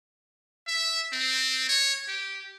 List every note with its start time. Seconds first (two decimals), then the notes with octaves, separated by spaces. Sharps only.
0.67 E5
1.13 C4
1.69 C#5
2.08 G4